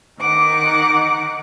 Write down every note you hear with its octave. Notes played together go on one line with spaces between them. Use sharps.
D#3 D#4 F#5 D6